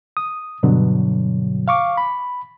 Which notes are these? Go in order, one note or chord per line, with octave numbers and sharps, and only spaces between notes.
D#6
G2 B2 D3 F#3
F5 C#6 D6
B5